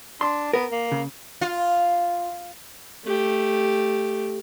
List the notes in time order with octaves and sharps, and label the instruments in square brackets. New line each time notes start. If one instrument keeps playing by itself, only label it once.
[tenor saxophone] D4 [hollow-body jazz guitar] C6
[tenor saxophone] B3 [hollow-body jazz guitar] A#4
[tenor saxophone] A#3
[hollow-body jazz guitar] C#3
[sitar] F4
[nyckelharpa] A3 G4